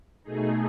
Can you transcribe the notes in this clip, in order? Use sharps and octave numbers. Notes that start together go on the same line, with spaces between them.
B2 A3 D#4 G#4